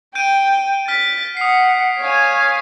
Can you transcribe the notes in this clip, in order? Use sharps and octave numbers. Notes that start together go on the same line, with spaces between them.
G5 G6 D7 D#7
F6 A6 B6
F#5 D#6 C7
C#5 F5 G#5